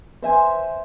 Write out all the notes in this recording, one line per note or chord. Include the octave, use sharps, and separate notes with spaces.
C5 E5 G#5